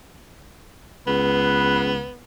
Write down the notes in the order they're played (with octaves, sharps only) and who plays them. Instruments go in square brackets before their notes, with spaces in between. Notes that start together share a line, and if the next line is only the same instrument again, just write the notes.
[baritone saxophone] C#2 [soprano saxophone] B3 [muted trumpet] B4